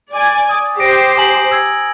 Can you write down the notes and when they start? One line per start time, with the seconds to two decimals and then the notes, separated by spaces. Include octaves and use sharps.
0.12 D5 G#5
0.49 D#6
0.80 G4 C5 A#6 D7
1.17 G#5 A#5 F#7
1.51 E6 G#6 C#7